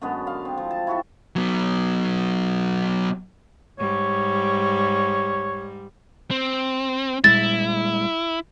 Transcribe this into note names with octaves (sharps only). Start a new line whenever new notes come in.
F#2 D3 G#3 B3
F5
C4
F3
A5
E4 F#4 G4 A4
F#3 B3
G#2 G3 C#5
C4
A#2 G3 G#3 E4 A6